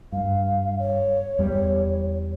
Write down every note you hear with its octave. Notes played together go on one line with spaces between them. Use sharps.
G2 F5
C#5
E2 G3